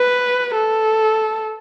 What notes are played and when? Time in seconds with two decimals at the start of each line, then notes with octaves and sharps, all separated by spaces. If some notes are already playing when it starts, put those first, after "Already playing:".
Already playing: B4
0.55 A4